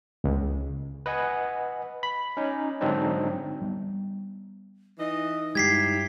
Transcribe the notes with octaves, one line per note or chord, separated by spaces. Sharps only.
C#2
B4 D#5 F#5 G#5
B5
C#4 D#4
G#2 D3 F#3 C4 D4 D#4
G3 B3
E3 D#4 D#5
G2 F#3 G#3 E4 G4 G#6 B6 C7